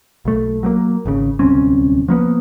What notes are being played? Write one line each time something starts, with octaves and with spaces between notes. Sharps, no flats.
B1 A3
F#3 A3 A#3
G#1 C#3
D1 C2 C4 C#4
F3 A#3 B3